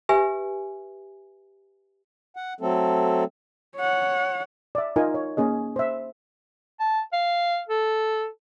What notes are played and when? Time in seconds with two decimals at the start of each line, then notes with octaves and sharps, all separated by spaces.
0.09 G4 B4 E5 G#5
2.36 F#5
2.61 F#3 A3 C4 A4
3.77 C#5 F#5
4.75 D5 E5
4.96 D#4 F4 A#4 G#5
5.14 C#5
5.37 A#3 C#4 G#4 D#5
5.76 C5 E5
6.80 A5
7.13 F5
7.69 A4